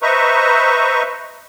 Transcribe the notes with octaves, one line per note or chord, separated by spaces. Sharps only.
B4 C5 D#5 E5 A#5 C#6